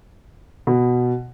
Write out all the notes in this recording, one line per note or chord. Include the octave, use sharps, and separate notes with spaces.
B2